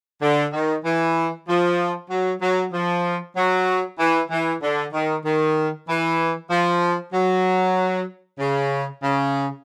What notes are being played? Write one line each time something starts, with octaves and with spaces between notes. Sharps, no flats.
D3
D#3
E3
F3
F#3
F#3
F3
F#3
E3
E3
D3
D#3
D#3
E3
F3
F#3
C#3
C#3